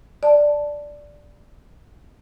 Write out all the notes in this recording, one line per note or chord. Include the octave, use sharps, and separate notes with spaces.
D5 A5